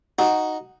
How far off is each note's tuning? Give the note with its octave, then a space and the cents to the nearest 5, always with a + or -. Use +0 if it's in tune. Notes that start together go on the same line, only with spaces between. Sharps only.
D#4 +0 F#4 +0